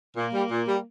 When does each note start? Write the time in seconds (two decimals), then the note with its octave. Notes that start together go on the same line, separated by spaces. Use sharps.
0.15 A#2 A#3
0.32 G3
0.50 A#2
0.66 G3